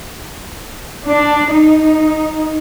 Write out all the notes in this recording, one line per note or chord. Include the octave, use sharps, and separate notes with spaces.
D4
D#4